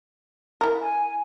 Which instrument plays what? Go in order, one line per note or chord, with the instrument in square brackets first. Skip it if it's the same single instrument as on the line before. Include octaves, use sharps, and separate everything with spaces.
[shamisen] E4 A#4
[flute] G#5